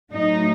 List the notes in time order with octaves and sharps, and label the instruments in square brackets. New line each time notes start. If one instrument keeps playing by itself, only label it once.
[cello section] A2 F#3 D#4